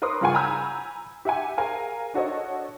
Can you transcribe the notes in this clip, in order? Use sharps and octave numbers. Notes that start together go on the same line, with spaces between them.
A#4 B4 C#5 C6 D6 D#6
G2 C#3 F4 F#5 G#5 C#6
G#5 A#5 B5 E6 G6 G#6
G4 E5 F#5 G#5
G#4 A#4 F5 G#5 A#5
D4 F#4 A4 C#5 D#5